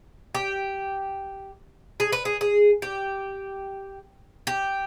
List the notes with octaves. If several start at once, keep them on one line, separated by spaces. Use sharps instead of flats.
G4
G#4
B4
G#4
G#4
G4
G4